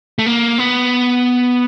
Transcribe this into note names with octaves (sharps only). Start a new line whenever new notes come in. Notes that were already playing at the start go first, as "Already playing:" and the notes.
A3
A#3
B3